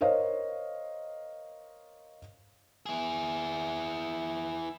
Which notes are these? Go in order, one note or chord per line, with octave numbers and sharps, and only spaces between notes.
A#4 C5 C#5 D#5 F5
E4 G#4